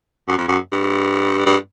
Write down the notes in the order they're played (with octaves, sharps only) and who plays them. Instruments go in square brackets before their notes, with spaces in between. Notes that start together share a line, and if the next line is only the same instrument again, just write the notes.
[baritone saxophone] F#2
F2
F#2
G2
G2